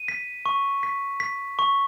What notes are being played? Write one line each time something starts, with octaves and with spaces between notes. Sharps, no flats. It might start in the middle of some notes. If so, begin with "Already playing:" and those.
Already playing: D#7
B6
C#6
B6
B6
C#6